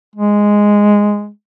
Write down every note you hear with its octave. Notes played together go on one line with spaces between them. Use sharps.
G#3